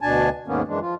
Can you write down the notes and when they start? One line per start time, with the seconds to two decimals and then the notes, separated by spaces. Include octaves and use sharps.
0.01 D2 B2 D4 G#5 A5
0.48 D#2 G#2 D#3 A#3 B3 C#4
0.68 F#2 E3 G#3 D4
0.81 F3 F4